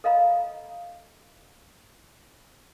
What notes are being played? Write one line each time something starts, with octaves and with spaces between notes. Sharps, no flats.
A4 D#5 F5 A#5 B5